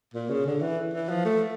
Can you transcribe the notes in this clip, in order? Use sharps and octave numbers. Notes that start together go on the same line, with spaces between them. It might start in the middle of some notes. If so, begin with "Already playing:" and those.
A#2
C#3
D3
E3
E3
F3
A3